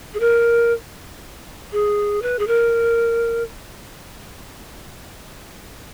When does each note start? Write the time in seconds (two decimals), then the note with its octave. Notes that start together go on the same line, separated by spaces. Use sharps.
0.14 G#4
0.20 A#4
1.72 G#4
2.22 B4
2.39 G#4
2.47 A#4